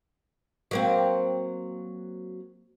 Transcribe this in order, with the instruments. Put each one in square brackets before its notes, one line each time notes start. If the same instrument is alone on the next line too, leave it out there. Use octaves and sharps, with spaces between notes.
[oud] F#3 A#3 C4